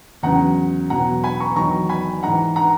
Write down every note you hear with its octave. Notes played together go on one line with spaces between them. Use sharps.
E2 C#3 F#3 F#5 A#5
E2 B2 F#3 F#5 A#5
G#5 B5
A#5 C#6
E2 D#3 F#3 A#5 C#6
G#5 B5
G#2 E3 F#5 A#5
F#5 A#5